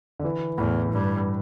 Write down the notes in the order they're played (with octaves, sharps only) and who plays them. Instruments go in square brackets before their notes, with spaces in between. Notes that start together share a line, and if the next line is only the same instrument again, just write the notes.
[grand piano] D3
E3
[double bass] E2 [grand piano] A2
[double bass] G2